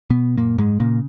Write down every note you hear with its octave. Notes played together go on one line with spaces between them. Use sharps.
B2 B3
F#2 A#2 A#3
G#2 G#3
A#2 C#3 A#3